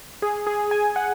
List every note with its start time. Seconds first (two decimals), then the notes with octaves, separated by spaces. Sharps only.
0.22 G#4
0.47 G#4
0.71 G#5
0.96 F#5